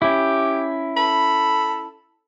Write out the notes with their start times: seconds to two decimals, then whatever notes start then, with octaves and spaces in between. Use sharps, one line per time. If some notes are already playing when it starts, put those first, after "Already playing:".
0.02 C#4 E4 G4
0.97 A4 B5